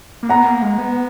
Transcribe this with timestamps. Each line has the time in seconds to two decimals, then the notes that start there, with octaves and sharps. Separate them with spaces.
0.23 A#3
0.29 B3 F#5 A#5
0.46 A#3
0.62 G#3
0.78 B3